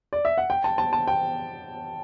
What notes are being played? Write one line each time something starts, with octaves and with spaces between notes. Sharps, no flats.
D5
E5
F#5
G5
A5
A5
A5
G5